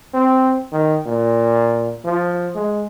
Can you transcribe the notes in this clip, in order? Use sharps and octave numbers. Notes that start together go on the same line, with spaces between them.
C4
D#3
A#2
F3
G#3